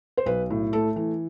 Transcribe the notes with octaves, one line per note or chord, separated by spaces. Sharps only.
C5
B1 B4
A2
A3 A4
E3